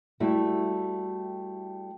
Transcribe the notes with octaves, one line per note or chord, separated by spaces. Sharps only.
G3 A3 E4 F#4 A4